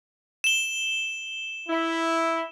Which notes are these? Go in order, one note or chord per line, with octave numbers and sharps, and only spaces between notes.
E7 G7
E4